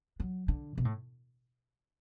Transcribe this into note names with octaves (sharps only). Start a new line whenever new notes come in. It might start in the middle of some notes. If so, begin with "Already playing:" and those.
F#3
D3
B2
A2